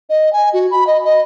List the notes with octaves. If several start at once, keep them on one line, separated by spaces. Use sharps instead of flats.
D#5
G#5
F#4
B5
D#5
D#5